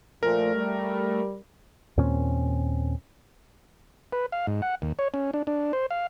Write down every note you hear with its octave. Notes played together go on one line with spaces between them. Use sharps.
A#2 F3 A3 A#4
G3
D#2 A#2 C4 C#4
B4
F5
G#2
F#5
D#2
C#5
C#4
D4
D4
C5
F5